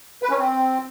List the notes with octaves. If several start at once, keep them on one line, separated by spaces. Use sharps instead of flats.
B4
C#4
C4